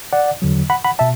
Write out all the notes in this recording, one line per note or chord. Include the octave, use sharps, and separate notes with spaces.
D5 F#5
E2 D3 F#3
F#5 B5
F#5 B5
B2 E5 A5